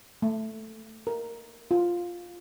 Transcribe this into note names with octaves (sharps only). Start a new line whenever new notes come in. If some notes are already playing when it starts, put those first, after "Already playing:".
A3
A#4
F4